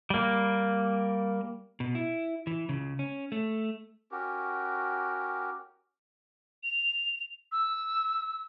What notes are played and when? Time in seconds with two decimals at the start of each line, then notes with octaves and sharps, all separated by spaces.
0.10 G3 A#3
1.80 B2
1.95 E4
2.47 E3
2.69 C#2 C#3
2.99 C#4
3.32 A3
4.11 C#4 F#4 G4 A#4
6.63 F7
7.52 E6